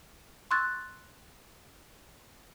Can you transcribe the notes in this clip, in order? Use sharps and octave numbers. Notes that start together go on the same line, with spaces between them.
C6 C#6 E6 F#6 G#6 A6